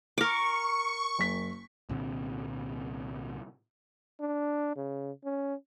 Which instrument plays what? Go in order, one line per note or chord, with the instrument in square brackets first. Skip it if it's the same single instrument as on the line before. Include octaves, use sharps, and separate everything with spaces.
[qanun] A#4 D6 [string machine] C#6
[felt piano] F#1 B6
[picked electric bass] C2 A#2 D3 C4
[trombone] D4
C#3
C#4